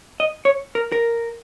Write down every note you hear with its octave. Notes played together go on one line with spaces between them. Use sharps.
D#5
C#5
A#4
A#4